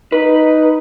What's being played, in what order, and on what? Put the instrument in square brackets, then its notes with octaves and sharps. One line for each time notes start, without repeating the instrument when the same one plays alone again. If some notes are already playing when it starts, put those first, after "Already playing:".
[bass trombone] D#4 [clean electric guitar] B4